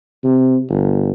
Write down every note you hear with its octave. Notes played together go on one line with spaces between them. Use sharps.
C3
G1